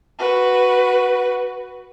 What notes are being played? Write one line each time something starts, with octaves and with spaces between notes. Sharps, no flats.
F#4 B4